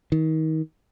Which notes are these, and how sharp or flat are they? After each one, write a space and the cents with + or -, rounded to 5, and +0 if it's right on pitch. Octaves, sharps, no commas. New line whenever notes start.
D#3 +30